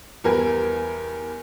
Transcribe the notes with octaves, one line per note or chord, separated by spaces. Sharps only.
E2 G3 A#4 B4 G#5